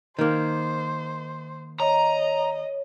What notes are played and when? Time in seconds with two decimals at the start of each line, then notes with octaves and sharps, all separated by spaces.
0.19 D#3 A#3 C5
1.80 C#5 D#5 A#5